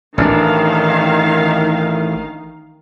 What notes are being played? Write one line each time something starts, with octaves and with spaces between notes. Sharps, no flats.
A1 D#3 C#4 D4 F5